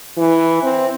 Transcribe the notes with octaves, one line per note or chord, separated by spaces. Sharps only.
E3
C4